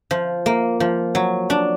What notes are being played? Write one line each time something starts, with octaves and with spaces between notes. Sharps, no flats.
F3
A#3
F3
F#3
D4